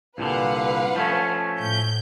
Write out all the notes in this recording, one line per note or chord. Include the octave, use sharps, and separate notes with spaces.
C2 A#2 D3 B4 F5 F#5
F3 A3 C#4
A2 G6